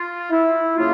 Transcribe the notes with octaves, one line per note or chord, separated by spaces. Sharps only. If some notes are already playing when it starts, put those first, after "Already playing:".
Already playing: F4
E4
C#3 F#3 A#3 F4